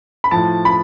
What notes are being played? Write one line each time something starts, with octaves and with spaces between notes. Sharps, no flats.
B5
A2 F3 A5
B5